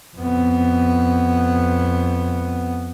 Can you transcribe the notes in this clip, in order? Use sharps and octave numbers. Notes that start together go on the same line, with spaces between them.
F2 B3